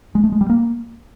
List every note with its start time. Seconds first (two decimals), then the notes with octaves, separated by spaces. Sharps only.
0.15 G#3
0.24 A3
0.32 G#3
0.41 G3
0.49 A#3